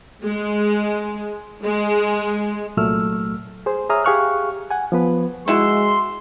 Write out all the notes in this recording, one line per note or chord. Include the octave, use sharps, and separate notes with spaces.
G#3
G#3
C2 A#2 F#3 A3 E6 F6
G#4 C5
G#4 C#5 E5 A#5 D#6 F6
G4 G#4 F5 C#6 F6 F#6
F#5 G#5
F3 B3 B4
G#3 E4 F#4 C6